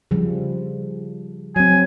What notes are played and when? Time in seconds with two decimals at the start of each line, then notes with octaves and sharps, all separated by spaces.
0.11 C#3 F3 G3
1.56 F#3 C4 G#5